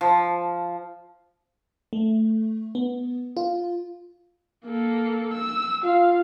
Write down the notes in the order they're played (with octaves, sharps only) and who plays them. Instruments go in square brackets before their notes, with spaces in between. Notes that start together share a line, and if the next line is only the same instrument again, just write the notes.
[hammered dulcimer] F3
[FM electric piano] A3
B3
F4
[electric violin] A#3 A4
E6
[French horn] F4 [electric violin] F5